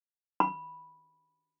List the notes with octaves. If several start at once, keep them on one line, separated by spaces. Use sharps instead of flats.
B5